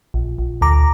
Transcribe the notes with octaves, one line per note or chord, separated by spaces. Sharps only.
A#1
A#1
D2 A#5 D6